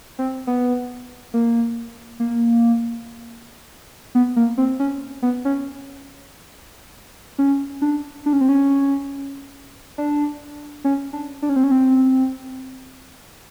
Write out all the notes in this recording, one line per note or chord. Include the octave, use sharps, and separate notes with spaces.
C4
B3
A#3
A#3
B3
A#3
C4
C#4
B3
C#4
C#4
D4
D4
C#4
C4
C#4
D4
C#4
D4
D4
C#4
C4
C#4
C4